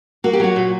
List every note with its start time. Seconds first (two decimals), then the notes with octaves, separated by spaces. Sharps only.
0.24 A#3 F#4
0.33 G4
0.40 F#3 F#4
0.56 A#2